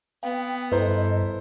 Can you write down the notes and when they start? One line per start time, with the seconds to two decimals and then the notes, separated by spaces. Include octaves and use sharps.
0.23 B3 F5 G5
0.72 G2 E4 A4 B4 C5 D#5 A#5